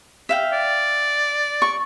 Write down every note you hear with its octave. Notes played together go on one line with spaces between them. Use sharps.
E5 F5 G5
D5
C#6